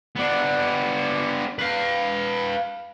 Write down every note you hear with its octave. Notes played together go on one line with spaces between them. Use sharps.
B3 D4
B4 F5